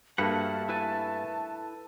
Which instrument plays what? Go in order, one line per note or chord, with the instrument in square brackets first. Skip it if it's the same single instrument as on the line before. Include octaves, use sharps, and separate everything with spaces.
[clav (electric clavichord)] G2 A#3 [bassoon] A3 [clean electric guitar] F#4 B4 F#5 [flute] A5
[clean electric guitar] E4 B4 G#5